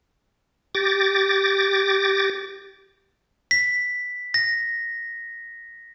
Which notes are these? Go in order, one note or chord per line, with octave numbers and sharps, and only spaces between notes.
G4 D6 A6 A#6
B6
A#6